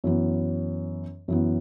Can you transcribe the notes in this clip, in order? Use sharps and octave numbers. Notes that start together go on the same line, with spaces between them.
F#2 E3 B3
F#2 E3 B3